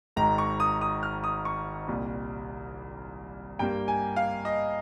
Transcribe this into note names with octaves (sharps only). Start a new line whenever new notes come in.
G#1 G#2 D#3 A#5
C#6
D#6
D#6
F6
D#6
C#6
C2 A#2 G3
G2 G3 A#3 G5
G#5
F5
D#5